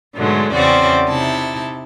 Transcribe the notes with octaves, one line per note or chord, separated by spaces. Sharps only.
G#2 B2 D3 F#3 G#3 A3
E2 C#3 C4 C#4 F#4 D5
C3 D#4 E4 A5